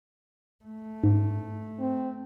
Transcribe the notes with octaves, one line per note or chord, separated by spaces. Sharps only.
A3
G#2
C4